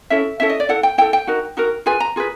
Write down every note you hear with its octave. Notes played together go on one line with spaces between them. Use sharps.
C#4 E4 A4 E5
C#4 E4 A4 E5
D#5
D5
E4 A4 F#5
G5
E4 A4 G5
G5
D#4 F#4 A#4
D#4 F#4 A#4
F4 G#4 B4 G#5
A#5
F4 G#4 B4